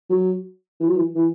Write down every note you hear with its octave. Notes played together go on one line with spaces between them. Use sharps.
F#3
E3
F#3
E3
E3